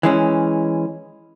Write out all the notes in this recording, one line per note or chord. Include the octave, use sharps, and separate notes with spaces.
E3 G#3 C#4